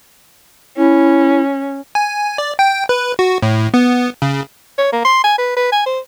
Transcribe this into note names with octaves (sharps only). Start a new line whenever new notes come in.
C#4 E4
G#5
D5
G5
B4
F#4
A2
B3
C#3
C#5
A#3
C6
G#5
B4
B4
G#5
C5